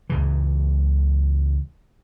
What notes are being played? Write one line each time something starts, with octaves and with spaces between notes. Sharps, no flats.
C#2 C#3 E3